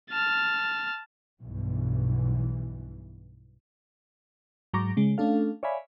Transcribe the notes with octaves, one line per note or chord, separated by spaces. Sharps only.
A5 F6
B1 G2 B2 E3
G#2 F#3 A#5 C#6 D6 A#6
C#3 G#3
A3 C#4 D4 A4 F5
C#5 D5 E5 F5 G#5 B5